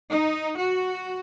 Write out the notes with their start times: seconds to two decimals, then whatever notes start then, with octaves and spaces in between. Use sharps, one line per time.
0.10 D#4
0.57 F#4